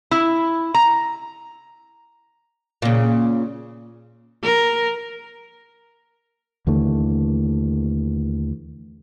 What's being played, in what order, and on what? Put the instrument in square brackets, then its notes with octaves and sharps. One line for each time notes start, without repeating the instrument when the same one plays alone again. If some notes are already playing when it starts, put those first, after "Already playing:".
[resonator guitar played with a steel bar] E4
A#5
[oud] A#2 C#3
[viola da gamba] A#4
[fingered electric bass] D#2 D3 E3 A3